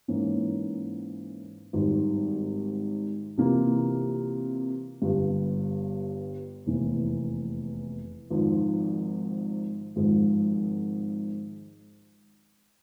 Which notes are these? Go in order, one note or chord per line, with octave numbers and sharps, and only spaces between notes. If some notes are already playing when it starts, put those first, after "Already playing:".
G#2 E3 A#3 C#4
G#1 G#2 G3
C3 E3 A#3 F4
G1 G2 G3
F1 E2 E3 A#3
G#1 G#2 F3
G#1 G#2 F3 G#3